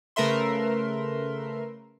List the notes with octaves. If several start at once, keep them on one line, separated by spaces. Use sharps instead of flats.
C#3 A3 A#4 B4 E5 C6